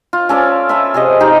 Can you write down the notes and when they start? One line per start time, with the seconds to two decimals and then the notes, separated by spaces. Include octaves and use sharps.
0.13 F4
0.29 C#4 A4 D5 F5
0.69 F4 A4 B4 E5
0.94 C3 G#4 D#5
1.20 D#4 G4